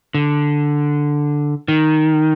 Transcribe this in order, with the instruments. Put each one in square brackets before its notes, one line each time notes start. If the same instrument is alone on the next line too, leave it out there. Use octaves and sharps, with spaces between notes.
[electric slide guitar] D3
D#3